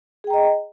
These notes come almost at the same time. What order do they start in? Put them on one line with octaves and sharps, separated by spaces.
G#4 G5 A#5 D#5